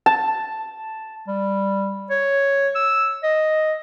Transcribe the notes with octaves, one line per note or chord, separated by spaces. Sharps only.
A5
G3
C#5
E6
D#5